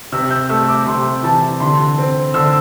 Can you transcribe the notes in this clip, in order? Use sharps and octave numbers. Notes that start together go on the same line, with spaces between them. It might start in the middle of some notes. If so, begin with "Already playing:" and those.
C3 E6
G6
A3 E6
D6
C3 C6
E3 A5
D3 C6
C4
D3 E6